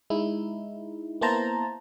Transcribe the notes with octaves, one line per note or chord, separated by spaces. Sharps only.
G#3 D#4 E4
A#3 B3 E4 C5 A5 A#5